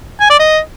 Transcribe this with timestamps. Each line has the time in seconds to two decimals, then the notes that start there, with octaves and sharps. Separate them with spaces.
0.20 G#5
0.30 D5
0.39 D#5